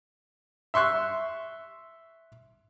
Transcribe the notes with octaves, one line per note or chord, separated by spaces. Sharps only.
E5 C6 C#6 F#6